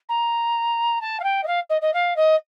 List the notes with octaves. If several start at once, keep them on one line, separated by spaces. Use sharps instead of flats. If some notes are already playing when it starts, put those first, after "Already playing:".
A#5
A5
F5
G5
D#5
F5
D#5
D#5
F5
D#5